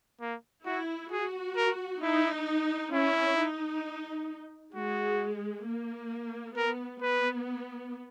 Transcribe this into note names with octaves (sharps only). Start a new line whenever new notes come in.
A#3
E4 F#4
F#4 G#4
A#4
D#4 E4
C#4 E4
D#4
G#3 F#4
A#3
B3 A#4
B3 B4